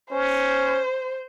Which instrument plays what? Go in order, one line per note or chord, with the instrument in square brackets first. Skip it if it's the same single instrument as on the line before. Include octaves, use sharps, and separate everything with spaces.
[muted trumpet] C#4 [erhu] C5